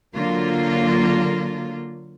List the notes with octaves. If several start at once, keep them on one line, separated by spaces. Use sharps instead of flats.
D3 F#3 A#3 F4